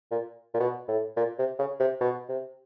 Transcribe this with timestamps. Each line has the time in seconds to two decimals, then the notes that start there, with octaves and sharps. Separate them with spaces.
0.11 A#2
0.54 A#2
0.60 B2
0.88 A2
1.17 A#2
1.39 C3
1.59 C#3
1.80 C3
2.01 B2
2.29 C3